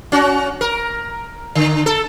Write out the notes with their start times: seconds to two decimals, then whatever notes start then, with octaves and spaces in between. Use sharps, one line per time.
0.12 C#4 F#4
0.61 A#4
1.55 D3
1.86 A4